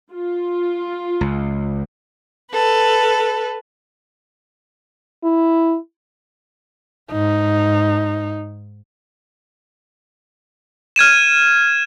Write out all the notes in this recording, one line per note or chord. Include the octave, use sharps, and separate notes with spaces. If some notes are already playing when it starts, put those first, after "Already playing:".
F4
C#2
A4 B4
E4
G#2 D#4
F6 G#6 D#7 E7